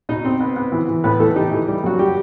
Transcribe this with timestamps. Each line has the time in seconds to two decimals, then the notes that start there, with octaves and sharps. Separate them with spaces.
0.09 B2 D#4 D#5
0.25 C4 C5
0.41 B3
0.56 B3
0.72 E3
0.88 E3
1.04 A2 B3 B4
1.20 E3 A3 A4
1.36 D#4 G4
1.52 E3
1.68 G3
1.84 F#2 F#4
1.99 G3 G4